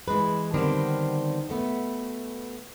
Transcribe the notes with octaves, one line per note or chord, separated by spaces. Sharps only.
E3 G#3 B4
D3 D#3 G3 B3 C4
B2 A3 B3